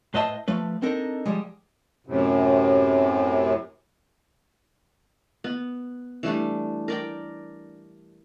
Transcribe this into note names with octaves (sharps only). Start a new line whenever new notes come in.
A2 B4 C5 D#5 E5 A5
F3 A3 B4
C4 D4 D#4 A4 A#4
F3 G3 G#3
F#2 A2 C3
B3
E3 G3 A3 D4
A#4 D5 G5